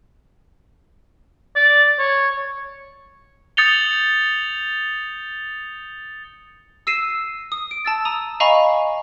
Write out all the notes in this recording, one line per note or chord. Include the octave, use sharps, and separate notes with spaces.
D5
C#5
D#6 G6 A6 C#7 F7 G7
E6 A#6 C7 D#7 E7
D#6
D7
A5 E6 A6
A#5 D#6 D#7
D#5 F5 G#5 A#5 B5 C#6